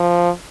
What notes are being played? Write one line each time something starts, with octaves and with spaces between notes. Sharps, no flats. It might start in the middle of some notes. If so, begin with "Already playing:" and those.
Already playing: F3